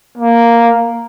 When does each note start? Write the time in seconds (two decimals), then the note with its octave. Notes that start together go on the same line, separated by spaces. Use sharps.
0.18 A#3